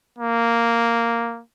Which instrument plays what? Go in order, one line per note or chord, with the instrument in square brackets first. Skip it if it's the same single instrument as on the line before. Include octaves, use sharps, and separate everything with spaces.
[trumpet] A#3